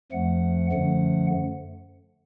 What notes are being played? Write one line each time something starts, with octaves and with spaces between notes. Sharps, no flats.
F2 F3 A3 F#5
F#2 D3 F3 A3 F#5